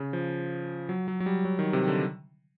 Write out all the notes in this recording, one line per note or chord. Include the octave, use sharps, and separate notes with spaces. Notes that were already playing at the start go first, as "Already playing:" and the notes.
Already playing: C#3
F3
F#3
F#3
F#3
G3
F#3
D#3
C3
D3